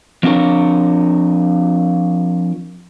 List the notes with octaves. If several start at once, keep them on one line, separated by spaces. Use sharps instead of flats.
F3 C4 D4 F4 A#4 C#5